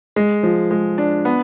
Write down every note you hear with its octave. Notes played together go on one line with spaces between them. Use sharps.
G#3
F3
G#3
D4
B3